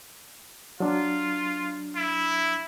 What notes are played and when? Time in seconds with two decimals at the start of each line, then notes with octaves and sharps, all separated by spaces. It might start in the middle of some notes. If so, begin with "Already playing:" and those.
0.80 F#3 D4 F4
1.97 E4